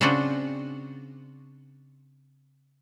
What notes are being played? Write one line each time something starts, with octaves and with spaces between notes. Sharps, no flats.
C#3 C4 D4 F4 F#4 C5